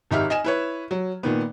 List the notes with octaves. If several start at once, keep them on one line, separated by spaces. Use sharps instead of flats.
G#1 D#4 G4 E5 F6
D#5 G#5 E7
E4 B4 C#5
F#3
A#2 D#3 B3